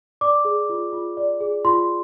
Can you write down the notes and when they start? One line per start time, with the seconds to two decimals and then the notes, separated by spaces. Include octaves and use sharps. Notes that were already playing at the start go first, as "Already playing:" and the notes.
0.21 D5 D6
0.45 G#4
0.69 F4
0.93 F4
1.17 D5
1.41 G#4
1.64 F4 C6